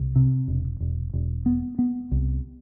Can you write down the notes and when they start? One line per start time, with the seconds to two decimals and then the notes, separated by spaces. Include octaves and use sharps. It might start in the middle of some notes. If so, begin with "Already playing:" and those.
Already playing: C2
0.16 C3
0.48 E1
0.81 E1
1.14 E1
1.46 B3
1.79 B3
2.11 C2